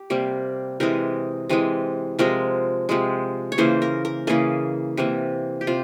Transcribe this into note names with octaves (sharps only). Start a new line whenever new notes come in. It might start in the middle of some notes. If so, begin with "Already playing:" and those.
Already playing: G4
C3 G3 A#3
C3 E3 G#3 A#4
C3 E3 G#3
C3 F3 G#3 A#4
C3 F3 G#3
C#5
C#3 E3 A#3 C5
A#4
A#4
C#3 E3 A#3 G#4
C3 E3 A#3
G4
C3 F4